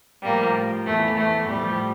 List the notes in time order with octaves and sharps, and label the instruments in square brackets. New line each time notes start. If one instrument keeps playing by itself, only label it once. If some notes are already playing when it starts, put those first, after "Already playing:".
[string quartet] A2 F3 G3 A#3
E2 E3 A3
A3
A2 F3 G3